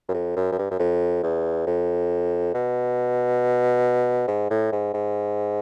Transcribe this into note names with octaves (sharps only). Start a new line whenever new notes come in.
F#2
F2
F#2
F#2
G2
F#2
F2
E2
F2
B2
G#2
A2
G#2
G#2